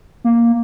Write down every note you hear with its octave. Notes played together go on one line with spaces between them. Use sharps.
A#3